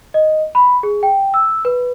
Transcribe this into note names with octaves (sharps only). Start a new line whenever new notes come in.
D#5
B5
G#4
G5
E6
B4